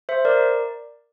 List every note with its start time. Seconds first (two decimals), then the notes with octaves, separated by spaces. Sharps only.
0.09 C5 E5
0.25 A#4 D5